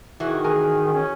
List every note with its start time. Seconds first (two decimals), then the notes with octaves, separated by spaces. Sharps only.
0.20 D#3 E3 F#4 G#4
0.44 G#4 A#4
0.94 C#4